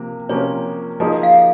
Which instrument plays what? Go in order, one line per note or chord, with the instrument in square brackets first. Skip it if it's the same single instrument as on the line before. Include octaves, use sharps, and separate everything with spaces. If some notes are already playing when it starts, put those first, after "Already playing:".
Already playing: [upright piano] C3 F3 A#3
[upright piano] C3 F3 A#3 C#4 [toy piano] C#5
[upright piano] F3 A#3 D#4 G#4
[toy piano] F5